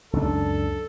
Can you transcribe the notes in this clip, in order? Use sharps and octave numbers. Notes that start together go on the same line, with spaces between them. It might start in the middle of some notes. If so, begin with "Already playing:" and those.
C#2 F#2 D4 A4